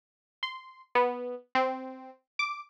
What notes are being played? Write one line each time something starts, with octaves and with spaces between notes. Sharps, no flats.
C6
B3
C4
D6